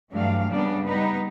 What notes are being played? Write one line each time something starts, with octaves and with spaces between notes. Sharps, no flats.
G2 E3 F#3 A3 D4 F5
C#3 G3 A#3 B3 D4
G3 B3 D#4 B4